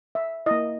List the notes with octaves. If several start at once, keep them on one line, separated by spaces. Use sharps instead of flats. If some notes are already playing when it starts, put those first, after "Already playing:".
E5
A#3 E4 D#5